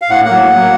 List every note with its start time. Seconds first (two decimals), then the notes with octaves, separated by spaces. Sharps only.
0.02 F5
0.10 A2 F#5
0.25 F#3 A#3 F#5
0.40 A2
0.55 F#3 A#3